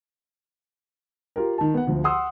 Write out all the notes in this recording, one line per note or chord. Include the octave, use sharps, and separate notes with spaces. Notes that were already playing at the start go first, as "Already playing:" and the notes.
F4 G4 A#4
D#3 A5
B3 F#5
D2 F3
F#5 C6 D#6 E6